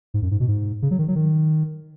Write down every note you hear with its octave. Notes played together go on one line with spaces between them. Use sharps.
G#2
F#2
G#2
B2
G#2
C#3
F#3
D#3
F#3
D#3